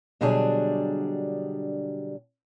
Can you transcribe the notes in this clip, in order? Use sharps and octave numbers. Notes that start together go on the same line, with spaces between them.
B2 D3 F#3 G3 D4 G#4